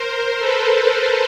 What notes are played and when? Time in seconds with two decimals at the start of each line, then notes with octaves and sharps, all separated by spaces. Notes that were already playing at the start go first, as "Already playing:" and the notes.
Already playing: A#4 C5
0.39 A4 B4